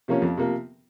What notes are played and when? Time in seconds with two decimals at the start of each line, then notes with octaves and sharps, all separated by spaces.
0.08 C3 F3 A#3 C#4
0.22 F2
0.37 C3 F3 A#3